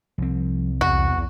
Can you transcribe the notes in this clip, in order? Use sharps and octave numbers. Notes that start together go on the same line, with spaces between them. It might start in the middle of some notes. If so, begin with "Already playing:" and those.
C2 F3 C4
B1 E2 F#4